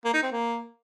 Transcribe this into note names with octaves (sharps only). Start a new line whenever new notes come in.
A#3
D#4
C4
A#3